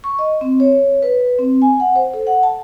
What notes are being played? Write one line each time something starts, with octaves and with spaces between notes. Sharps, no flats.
C#6
D#5
C4
C#5
B4
C4
G#5
F#5
C5
A4
F#5
A5